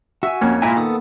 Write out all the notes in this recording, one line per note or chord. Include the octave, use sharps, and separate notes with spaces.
F#4 E5 G#5
F2 A#3 C#4
A#2 G#3 E4 F4 G#5
D#3 B3 A4 D#6